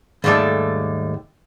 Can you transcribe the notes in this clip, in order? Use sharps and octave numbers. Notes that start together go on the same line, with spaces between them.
D#2 G#2 G3 A3 A4